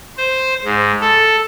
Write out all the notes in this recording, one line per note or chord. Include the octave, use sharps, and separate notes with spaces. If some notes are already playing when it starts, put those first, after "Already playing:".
C5
G#2
A4